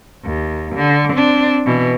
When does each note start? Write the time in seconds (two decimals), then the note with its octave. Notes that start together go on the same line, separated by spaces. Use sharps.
0.25 D#2
0.76 D3
1.13 C4 D4
1.66 B2 E3